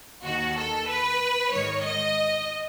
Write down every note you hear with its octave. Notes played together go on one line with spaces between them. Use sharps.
D#2 D#3 F#4
A4
B4
G#2 D#3 C#5
D#5